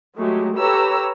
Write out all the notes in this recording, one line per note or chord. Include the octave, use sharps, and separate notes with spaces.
F#3 G#3 A3 F#4 G4
G4 A4 B4 C#5 A#5 E6